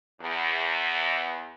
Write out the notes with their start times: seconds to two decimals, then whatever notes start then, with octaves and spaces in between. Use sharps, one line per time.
0.21 E2